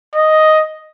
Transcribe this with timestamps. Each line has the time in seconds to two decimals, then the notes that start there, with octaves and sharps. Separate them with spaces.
0.15 D#5